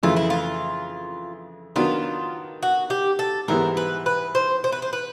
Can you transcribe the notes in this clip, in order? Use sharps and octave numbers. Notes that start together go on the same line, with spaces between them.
F2 C#3 E3 A3 F4
E4
F4
D#3 F#3 B3 D4 F4
F#4
G4
A4
G#2 E3 G3 B3 A#4
B4
B4
C5
C5
B4
C5
B4